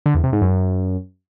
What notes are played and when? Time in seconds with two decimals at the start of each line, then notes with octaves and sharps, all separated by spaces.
0.06 D3
0.15 E2
0.24 C3
0.32 G#2
0.41 F#2